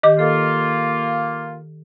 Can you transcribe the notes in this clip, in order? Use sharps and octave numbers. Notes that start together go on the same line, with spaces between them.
D#3 G4 D#5 D6
A#3 F4 A4